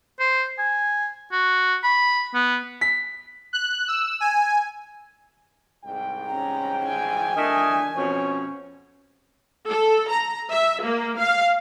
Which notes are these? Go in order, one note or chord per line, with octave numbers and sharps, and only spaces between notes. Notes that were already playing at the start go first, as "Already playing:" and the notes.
C5
G#5
F#4
B5
B3
B6
F#6
E6
G#5
C2 G#2 G5
C#4 A#5
G#5
A3 D4 A#4 D#5
F2 B2 C#4 C#5
A4
A#5
E5
A#3
F5